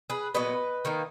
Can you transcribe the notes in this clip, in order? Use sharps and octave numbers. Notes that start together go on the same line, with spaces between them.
G#4 B4
A#2 F#3 B3 B4 D#5
D#3 A#3 D#4